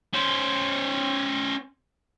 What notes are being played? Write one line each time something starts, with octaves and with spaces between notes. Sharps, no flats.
C#4 C5